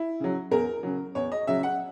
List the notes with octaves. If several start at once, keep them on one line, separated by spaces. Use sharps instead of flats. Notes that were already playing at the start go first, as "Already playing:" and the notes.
Already playing: E4
C#3 F#3
E2 A#4
C#3 F#3
E2 C#5
D#5
C#3 F#3 E5
F#5